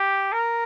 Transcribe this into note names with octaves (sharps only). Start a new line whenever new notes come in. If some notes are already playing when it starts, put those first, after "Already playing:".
Already playing: G4
A#4